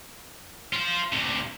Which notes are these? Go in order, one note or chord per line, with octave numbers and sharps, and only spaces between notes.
F4 C5
D2 C3